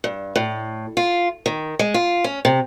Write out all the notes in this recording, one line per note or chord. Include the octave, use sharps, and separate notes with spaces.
G2
A2
F4
D#3
G#3
F4
C#4
C3